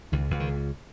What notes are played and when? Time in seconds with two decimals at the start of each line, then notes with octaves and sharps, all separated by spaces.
0.12 C#2 D#3
0.31 C#2
0.40 D#3